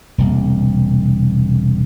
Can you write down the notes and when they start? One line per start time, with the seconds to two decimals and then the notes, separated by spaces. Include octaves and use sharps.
0.18 E1 C2 A#3